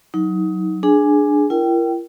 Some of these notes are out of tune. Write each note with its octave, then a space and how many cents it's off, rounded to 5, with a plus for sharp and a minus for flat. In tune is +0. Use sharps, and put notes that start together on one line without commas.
F#3 +0 D#4 +25
D4 +10 G#4 +10 G#5 +0
E4 +45 A#4 +5 G5 -15